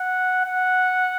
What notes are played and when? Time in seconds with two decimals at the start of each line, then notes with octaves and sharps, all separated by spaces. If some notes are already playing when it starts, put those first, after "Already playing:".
Already playing: F#5
0.45 F#5